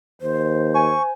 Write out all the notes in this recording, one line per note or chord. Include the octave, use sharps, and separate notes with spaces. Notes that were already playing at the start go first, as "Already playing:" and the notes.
D#2 C5
G#5 C#6